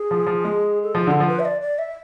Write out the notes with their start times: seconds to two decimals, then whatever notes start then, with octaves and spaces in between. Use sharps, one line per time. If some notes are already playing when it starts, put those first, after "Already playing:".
Already playing: G#4
0.11 F3
0.27 F3
0.45 G#3
0.83 A4
0.95 F3 G#4
1.07 D3 A4
1.20 F3
1.28 B4
1.39 E5
1.45 D5
1.61 D5
1.78 E5